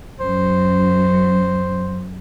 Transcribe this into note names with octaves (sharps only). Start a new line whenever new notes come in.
F#2 F#3 C5